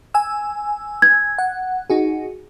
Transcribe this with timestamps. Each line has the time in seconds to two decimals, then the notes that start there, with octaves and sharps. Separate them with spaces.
0.14 G#5 E6
1.02 G#6
1.38 F#5
1.90 D#4 F#4 G#4